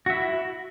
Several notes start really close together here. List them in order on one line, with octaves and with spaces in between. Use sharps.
F#4 E5 E4